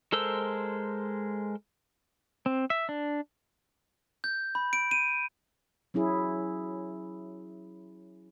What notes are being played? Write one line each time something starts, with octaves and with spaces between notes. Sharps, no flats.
G#3 A4 A#4 C5 E6
C4
E5
D4
G6
B5
D7
D#7
F#3 C#4 E4 G#4